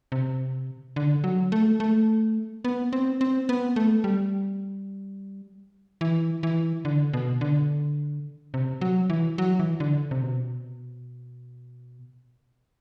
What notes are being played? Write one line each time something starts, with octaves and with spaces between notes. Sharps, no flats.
C3
D3
F#3
A3
A3
B3
C4
C4
B3
A3
G3
E3
E3
D3
B2
D3
C3
F#3
E3
F#3
E3
D3
C3
B2